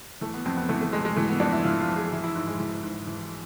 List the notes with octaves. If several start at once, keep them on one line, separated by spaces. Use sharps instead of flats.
E3 A3
B3
F2 C4
B3
E3 A3
A3
F2 G#3
G#3
E3 A3
B3
F2 D4
E4
E3 F4
F4
F2
G#4
E3 E4
E4
G#2
G#3
E3
G#2
E3